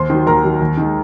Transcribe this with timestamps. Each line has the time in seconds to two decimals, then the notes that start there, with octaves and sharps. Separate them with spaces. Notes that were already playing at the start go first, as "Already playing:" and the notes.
Already playing: D#2 C5 C6
0.10 D#3 F#3
0.26 D#2 A#4 A#5
0.44 D#3 F#3
0.61 D#2
0.77 D#3 G#3